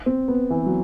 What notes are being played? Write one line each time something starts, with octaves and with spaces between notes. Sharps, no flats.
C4
B3
E3
F#3